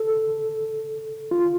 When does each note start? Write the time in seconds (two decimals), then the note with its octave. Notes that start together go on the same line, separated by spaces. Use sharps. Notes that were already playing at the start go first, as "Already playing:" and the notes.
Already playing: A4
1.31 F4